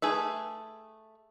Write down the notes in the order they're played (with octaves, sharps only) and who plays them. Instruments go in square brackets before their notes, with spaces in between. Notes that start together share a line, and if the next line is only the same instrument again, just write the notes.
[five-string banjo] A3 G#4 B4 E5